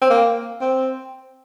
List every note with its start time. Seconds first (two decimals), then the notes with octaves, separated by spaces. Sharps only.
0.01 C4
0.10 A#3
0.61 C4